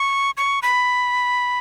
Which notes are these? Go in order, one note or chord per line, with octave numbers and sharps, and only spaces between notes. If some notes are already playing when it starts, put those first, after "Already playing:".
Already playing: C#6
C#6
B5